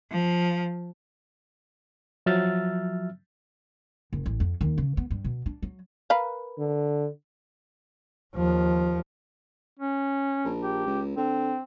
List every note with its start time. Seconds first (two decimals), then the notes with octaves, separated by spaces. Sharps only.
0.11 F3
2.26 F3 F#3 E5 E6 F6 A6
4.13 F#1
4.26 A1
4.40 F2
4.61 D#2
4.78 C#3
4.97 B3
5.11 G2
5.24 B2
5.46 D4
5.62 F#3
6.10 A#4 B4 F5
6.59 D3
8.35 D#2 F3
9.79 C#4
10.45 A#1
10.63 G4
10.86 C#2
11.17 D3 C4